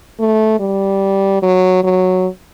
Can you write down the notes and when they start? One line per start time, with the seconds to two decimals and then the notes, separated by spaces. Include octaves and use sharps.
0.19 A3
0.60 G3
1.43 F#3
1.84 F#3